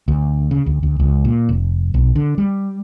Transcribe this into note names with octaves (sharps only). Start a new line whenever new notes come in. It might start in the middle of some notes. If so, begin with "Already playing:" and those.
D2
C#3
D2
D2
C#2
A#2
F1
B1
D3
G3